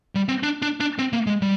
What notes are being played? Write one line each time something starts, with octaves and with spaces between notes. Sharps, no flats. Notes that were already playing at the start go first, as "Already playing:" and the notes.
G3
C4
D4
D4
D4
C4
A#3
G#3
G3